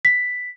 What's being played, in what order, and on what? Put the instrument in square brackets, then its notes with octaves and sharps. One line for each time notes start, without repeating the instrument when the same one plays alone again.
[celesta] B6